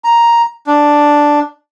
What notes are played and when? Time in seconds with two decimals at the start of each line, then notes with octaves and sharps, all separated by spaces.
0.04 A#5
0.67 D4